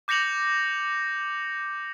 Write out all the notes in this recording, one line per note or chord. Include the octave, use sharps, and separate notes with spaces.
D6 G6 A#6 C#7 F7 F#7